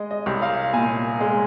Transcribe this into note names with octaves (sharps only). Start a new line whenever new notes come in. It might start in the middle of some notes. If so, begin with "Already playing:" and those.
Already playing: G#3 D#5
D#5
C2
F5
A#2 G#5
G#3